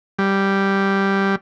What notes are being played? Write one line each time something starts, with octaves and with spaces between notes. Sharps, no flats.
G3